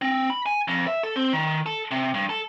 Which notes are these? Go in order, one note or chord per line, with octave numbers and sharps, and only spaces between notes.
C4
B5
G#5
F2
E5
A4
C4
D#3
A4
C3
G2
A4